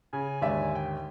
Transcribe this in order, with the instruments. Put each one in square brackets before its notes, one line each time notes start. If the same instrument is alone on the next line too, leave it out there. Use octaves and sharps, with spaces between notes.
[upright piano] C#3 [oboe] G#5
[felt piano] D#2 G#2 D3 [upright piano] D5 E5
[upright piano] G5